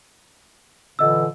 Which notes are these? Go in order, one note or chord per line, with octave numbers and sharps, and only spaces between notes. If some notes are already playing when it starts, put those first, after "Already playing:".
A#2 D3 E3 D#5 E6